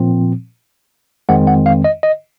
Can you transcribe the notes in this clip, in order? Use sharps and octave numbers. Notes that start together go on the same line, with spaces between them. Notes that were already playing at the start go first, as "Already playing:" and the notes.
Already playing: A#2 F3 C4
F2 D#3 G#3 C4 F#5
F#5
F5
D#5
D#5